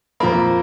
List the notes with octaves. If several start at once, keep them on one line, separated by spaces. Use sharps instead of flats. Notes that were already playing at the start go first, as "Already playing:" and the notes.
F2 F3 A#3 B5